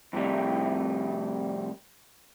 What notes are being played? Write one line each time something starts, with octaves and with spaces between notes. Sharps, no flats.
F2 A2 C3 G3